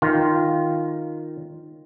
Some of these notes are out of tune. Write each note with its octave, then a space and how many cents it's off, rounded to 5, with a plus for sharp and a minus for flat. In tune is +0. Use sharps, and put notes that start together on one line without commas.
D#3 +0 F4 +0